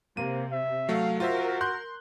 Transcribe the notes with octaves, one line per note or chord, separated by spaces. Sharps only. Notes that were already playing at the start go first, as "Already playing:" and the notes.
C3 A#3 D#7
E5
F#3 A3 F5
F4 F#4 A#4 C5 E5
C6 F#6 G6